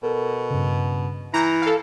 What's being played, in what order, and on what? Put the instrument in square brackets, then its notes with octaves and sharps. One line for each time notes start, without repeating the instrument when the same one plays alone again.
[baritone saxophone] B2 [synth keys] A4 A#4
[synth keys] G2 C#3
[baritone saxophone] E3 [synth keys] E4 G6 [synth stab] A#5
[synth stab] A4 F5